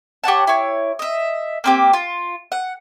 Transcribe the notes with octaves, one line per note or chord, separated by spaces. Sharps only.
G4 C#5 F#5 A5
E4 C#5
D#5 E5
A#3 C4 G4
F4
F#5